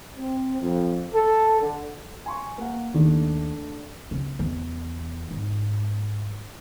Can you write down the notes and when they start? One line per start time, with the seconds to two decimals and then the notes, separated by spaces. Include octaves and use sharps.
0.17 C4
0.61 F2
1.14 A4
1.61 D3
2.26 G#5 C6 C#6
2.58 A#3 F#5
2.95 D#2 A3 D4
4.11 C#2
4.39 E2
5.31 G#2